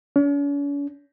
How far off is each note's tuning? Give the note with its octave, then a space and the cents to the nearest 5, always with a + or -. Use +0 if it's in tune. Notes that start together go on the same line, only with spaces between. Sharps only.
C#4 +45